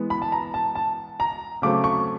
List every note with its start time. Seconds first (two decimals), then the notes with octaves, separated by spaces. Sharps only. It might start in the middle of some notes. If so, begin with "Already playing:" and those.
Already playing: E3 G#3 B3
0.10 B5
0.22 A5
0.32 A#5
0.54 A5
0.75 A5
1.20 A#5
1.62 C#3 F#3 A3 C4 D6
1.84 C#6